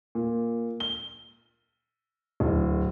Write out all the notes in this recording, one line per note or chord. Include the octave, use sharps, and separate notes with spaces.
A#2
G7
D1